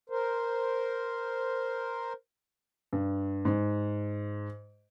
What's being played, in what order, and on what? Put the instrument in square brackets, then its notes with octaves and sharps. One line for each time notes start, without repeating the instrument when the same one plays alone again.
[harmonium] A#4 C5
[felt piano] G2
G#2